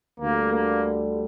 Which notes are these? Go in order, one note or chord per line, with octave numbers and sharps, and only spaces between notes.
D2 D3 G3 A#3
A#3